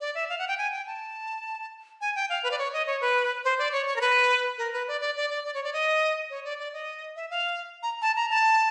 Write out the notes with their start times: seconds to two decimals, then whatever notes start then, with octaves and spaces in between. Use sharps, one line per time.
0.01 D5
0.15 E5
0.29 F5
0.39 F#5
0.48 G5
0.58 G#5
0.72 G5
0.87 A5
2.01 G#5
2.16 G5
2.29 F5
2.43 B4
2.51 D5
2.59 C#5
2.73 D#5
2.87 C#5
3.01 B4
3.44 C5
3.59 D5
3.72 C#5
3.86 C#5
3.96 A#4
4.01 B4
4.58 A#4
4.73 B4
4.88 D5
5.01 D5
5.16 D5
5.30 D5
5.44 D5
5.54 C#5
5.64 D5
5.73 D#5
6.30 C#5
6.44 D5
6.59 D5
6.73 D#5
7.16 E5
7.30 F5
7.83 A#5
8.02 A5
8.16 A#5
8.30 A5